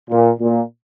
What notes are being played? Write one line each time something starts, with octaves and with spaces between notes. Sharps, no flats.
A#2
A#2